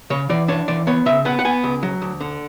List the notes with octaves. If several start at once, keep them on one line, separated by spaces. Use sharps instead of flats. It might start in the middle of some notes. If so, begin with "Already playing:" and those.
C#3 C#5
E3 D5
D4 C#5
E3 D5
B3 C#5
C#3 E5
B3 F#5
F#5
B3 G#5
C#2
F#3
D2
D3